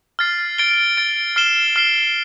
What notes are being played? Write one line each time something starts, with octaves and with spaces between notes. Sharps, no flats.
F6 A6 C7
A6 D7 G7
A6 D7 G7
F6 C7 E7 G7
F6 C7 E7 G7